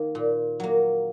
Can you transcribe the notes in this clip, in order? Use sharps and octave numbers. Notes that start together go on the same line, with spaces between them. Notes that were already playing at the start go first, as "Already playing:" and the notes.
Already playing: D#3 A#3
A#2
F#3 A#3